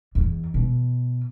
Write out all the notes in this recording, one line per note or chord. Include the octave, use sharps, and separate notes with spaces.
E2
B2